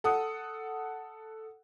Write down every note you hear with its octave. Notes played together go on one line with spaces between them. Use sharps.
A4 F#5 D#6